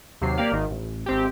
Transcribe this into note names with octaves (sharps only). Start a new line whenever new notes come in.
D#2 C3 F#3 C7
A#3 G4 D5 F5
G#1 D#3
A1
G#1 C4 G4